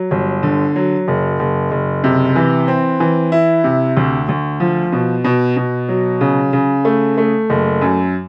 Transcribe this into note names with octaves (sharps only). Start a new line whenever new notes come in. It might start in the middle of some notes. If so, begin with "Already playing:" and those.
Already playing: F#3
G1
D3
F#3
F#1
F#1
F#1
C3
E3
C4
E3
E4
C3
D2
D2
F3
B2
B2
B2
F#3
C#3
C#3
A3
A3
F#1
F#2